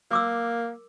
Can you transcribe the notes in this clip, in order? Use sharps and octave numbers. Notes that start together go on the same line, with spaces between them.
A#3 A#4 D6 E6